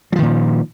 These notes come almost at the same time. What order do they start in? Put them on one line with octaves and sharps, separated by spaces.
F#3 F3 D#3 A#2